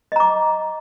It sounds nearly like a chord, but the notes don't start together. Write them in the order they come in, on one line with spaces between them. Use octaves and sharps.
D#5 A#5 D6